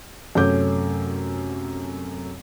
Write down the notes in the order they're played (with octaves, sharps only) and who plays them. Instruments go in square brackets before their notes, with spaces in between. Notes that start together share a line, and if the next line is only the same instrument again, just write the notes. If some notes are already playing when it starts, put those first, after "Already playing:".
[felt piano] F#2 C3 A3 C#4 D6 G6